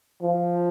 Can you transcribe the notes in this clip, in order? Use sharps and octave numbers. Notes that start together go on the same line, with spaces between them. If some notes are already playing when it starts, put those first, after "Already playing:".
F3